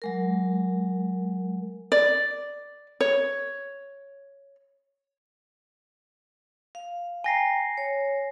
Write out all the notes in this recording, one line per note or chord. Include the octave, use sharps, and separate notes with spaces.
F#3 G#3 A#4
D5
C#5
F5
G5 G#5 A#5 A#6 C7
C#5